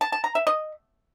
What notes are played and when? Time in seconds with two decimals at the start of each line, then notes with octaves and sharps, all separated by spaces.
0.01 A5
0.12 A5
0.24 A#5
0.35 E5
0.47 D#5